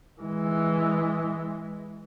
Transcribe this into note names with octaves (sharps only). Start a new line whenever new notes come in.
E3 G#3